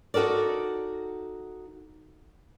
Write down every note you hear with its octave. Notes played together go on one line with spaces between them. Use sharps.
D#4 F#4 A4 A#4 D5